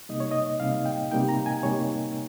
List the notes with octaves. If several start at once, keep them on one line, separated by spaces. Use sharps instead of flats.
C3 G3 A#3 D#4 D#5
C#5
D#5
C3 G3 A#3 D#4 F5
G5
C3 G3 A#3 D#4 G5
A#5
G#5
C3 G3 A#3 D#4 C#5